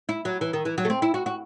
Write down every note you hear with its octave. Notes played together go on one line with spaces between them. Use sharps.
E4
F#3
E3
D#3
E3
F#3
A3
C4
E4
F#4
F#4